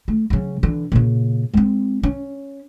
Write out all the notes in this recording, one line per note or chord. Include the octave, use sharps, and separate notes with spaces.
A3
C#3 F#3
D3 E3
A#2 C#3
G#3 C4
C#4